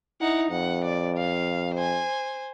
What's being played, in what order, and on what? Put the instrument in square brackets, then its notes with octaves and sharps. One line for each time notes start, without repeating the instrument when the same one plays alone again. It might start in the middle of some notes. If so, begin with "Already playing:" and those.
[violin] D#4 F#5 [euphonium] E4
[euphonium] F2 [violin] F#5
[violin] D5
F5
C5 G#5